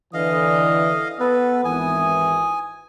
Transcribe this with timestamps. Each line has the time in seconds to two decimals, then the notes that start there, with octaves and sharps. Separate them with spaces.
0.14 D3 E3 D#5 F5 D#6
1.20 B3 A4 B4
1.65 G#1 E3 G#5 D#6